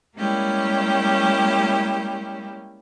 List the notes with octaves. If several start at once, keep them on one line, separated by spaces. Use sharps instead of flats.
G3 G#3 A#3 C#4 E4 G4